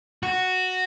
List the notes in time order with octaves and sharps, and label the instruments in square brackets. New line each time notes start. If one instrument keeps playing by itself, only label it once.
[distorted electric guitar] F#4